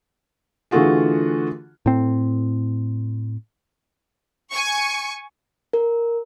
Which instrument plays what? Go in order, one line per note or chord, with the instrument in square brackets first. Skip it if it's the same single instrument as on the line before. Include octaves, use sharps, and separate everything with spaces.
[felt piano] D3 E3 A3 F4 F#4 G#4
[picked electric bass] A2 C4
[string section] G#5 C#6
[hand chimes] A#4